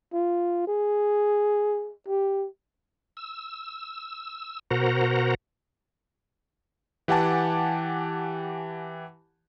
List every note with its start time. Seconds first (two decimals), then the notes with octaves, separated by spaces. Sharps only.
0.13 F4
0.68 G#4
2.08 G4
3.17 E6
4.71 B2 F#4 A#4 C5 F#5 A#5
7.08 E3 G4 F#5 G#5 A5 D6